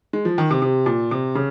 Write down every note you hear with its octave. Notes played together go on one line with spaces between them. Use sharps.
G#3
F3
D#3
C3
C3
A#2
C3
C#3